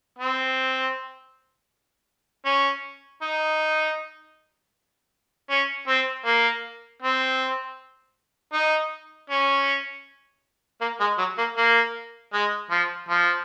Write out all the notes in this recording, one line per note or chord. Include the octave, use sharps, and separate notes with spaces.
C4
C#4
D#4
C#4
C4
A#3
C4
D#4
C#4
A#3
G#3
F#3
A#3
A#3
G#3
F3
F3